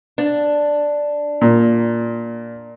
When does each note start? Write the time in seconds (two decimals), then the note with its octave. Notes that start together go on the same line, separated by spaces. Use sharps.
0.18 D4
1.41 A#2